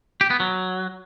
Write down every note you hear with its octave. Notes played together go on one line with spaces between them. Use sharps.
G4
B3
F#3